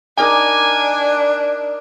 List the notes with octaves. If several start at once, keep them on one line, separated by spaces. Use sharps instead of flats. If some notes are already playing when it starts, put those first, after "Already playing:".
D4 D#4 A#4 G#5 D6